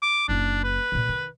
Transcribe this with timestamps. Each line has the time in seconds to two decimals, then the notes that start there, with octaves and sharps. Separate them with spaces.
0.02 D6
0.28 F#1 D4 E4
0.64 B4
0.92 A#2 D3
1.09 D#3